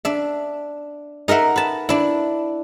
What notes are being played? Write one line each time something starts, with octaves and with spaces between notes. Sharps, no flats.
D4 E5
D#4 A#4 D#5 E5 F#5
B4 A5
D4 E4